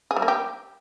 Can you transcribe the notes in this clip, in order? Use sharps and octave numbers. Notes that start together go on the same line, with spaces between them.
G#4
G3
A#3
G4